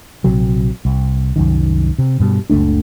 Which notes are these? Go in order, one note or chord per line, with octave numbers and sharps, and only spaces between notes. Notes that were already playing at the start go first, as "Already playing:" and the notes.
A#1 C3 F#3
C2
C2 F#2 D#3
C3
G2 B2 G3
F#1 C#2 A3 D4